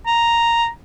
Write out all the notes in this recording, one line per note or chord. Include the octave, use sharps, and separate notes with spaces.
A#5